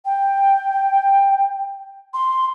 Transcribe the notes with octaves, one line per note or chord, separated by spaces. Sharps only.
G5
C6